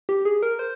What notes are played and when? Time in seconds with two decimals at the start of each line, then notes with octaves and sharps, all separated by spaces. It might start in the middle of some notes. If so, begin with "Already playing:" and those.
0.09 G4
0.25 G#4
0.42 A#4
0.59 C5